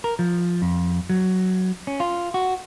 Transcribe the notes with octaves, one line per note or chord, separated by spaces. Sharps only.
A#4
F3
F2
F#3
C#4
F4
F#4